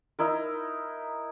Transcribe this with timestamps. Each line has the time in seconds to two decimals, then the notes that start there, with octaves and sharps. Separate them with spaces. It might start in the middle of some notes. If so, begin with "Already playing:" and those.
0.19 D#4 E4 A#4